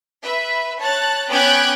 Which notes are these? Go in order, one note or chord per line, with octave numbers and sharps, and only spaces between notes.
B4 E5
C#5 A5 F#6 A6
B3 C#4 G5 D6 F#6 G#6